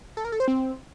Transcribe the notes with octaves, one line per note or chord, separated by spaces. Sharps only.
A4
A#4
A4
C5
C4